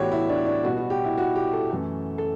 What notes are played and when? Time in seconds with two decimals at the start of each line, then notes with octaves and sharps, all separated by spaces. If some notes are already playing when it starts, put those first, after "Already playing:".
Already playing: A2 E3 B3 F#4 G4 C#5 D5
0.12 E4
0.29 D4
0.46 D4
0.64 B2 G3 B3 F#4
0.77 F#4
0.90 G4
1.04 E4
1.18 F#4
1.35 G4
1.53 A4
1.70 F#2 E3 A3
2.18 A4